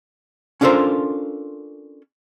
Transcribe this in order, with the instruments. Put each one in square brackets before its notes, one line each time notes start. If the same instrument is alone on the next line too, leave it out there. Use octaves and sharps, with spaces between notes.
[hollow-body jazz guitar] C#4 D4 F4 A4 A#4 C5